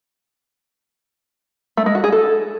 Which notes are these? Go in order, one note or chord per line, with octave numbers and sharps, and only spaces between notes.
A3
G#3
F#4
G#4
A4